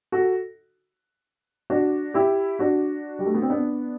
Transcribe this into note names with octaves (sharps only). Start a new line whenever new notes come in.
F#4 A4
D4 F#4
E4 G4
D4 F#4
G3
A3
B3
C4
B3 D4